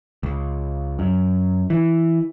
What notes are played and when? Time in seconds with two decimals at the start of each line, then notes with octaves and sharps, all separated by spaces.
0.23 C#2
0.99 F#2
1.70 E3